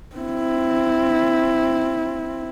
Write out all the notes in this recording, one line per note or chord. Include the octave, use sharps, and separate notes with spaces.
C4 E4